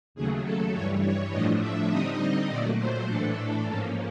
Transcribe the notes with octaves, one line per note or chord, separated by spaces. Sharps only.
D#2 C#3 F#3 A3 G#4
A4
G2 E3 G3 C#5
C#5
A2 F3 A3 D4 D#5
E5
D3 G3 C4 D#4 D#5
A#2 F#3 A3 D5
C5
A2 E3 A3 D4 A4
G#2 F3 A#3 C#4 A4